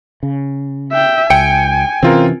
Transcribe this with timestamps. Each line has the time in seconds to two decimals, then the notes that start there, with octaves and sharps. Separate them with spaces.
0.23 C#3
0.92 E5 G5
1.30 C#2 G5 G#5 C#7 D7
2.03 C3 E3 C4 C#4 F4 A#4